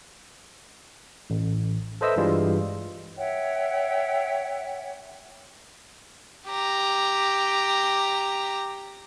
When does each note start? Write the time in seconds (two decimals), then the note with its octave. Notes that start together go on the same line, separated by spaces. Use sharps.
1.30 A1
2.01 A4 B4 C5 D#5 E5 E6
2.16 G2 E3 G3 G#3 F4
3.18 C#5 E5 F#5 G5
6.49 G4 A#5